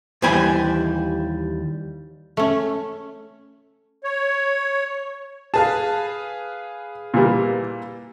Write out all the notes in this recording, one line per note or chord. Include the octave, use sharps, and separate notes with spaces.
D#2 E3 G3 C5 G#5 B5
A3 C#4
C#5
G#4 B4 F5 A5
A#2 E3 G3